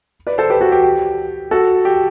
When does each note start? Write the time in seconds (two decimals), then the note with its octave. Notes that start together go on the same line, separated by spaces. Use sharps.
0.27 B4 D5
0.38 A4 C5
0.50 G4 B4
0.61 F#4 A4
0.72 G4
0.83 G4
1.51 F#4 A4
1.85 G4